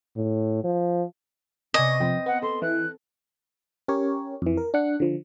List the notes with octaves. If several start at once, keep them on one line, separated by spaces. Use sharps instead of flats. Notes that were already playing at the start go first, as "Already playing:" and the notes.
A2
F3
C3 B3 D5 D#5 G#5 C#6
F2 C4 B4 G5
B3 F#5
A4 C6
E3 F#6
C#4 G4 A#4 C#5
F2 E3
A#4
D4 F#5
D3 F3